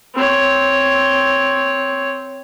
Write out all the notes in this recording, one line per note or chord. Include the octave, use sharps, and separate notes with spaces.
C4 C#5